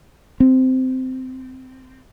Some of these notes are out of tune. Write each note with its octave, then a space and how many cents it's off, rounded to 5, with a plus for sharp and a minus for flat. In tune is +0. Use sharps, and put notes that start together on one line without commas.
C4 -15